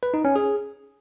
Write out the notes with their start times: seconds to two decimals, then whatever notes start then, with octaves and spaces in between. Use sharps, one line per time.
0.03 B4
0.14 D#4
0.25 C#4
0.36 G#4